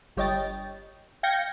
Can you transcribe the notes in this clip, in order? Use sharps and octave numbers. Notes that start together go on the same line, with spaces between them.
G1 G3 C#5 D#5 G5 A6
F5 G5 G6 G#6 A#6 C#7